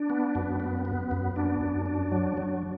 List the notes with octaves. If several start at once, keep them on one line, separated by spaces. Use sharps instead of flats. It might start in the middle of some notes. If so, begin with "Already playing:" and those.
Already playing: D4
B3
F#2
B3
B3
F#2
D4
F#2
D4
F#3
F#3